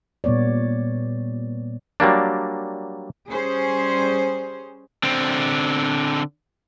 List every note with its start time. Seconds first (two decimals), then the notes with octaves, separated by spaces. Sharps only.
0.24 A#2 G3 B3 C#5 D5
2.00 F#3 G3 A#3 D4
3.29 G3 C#4 G#4 C5
5.03 D3 C4